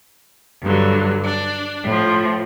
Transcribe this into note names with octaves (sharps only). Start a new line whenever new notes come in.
G2 D3 F#3
D4
A2 F3